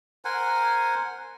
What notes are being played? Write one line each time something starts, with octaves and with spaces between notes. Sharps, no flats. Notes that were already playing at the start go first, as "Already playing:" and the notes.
A#4 C5 F#5 G#5